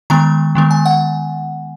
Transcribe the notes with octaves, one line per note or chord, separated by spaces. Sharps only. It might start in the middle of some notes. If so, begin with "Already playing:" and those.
D#3 G#3 B3 A#5
D#3 G#3 B3
G#5
F#5